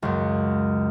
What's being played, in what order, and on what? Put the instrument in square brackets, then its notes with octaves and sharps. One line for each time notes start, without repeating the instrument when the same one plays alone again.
[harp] C#2 F#2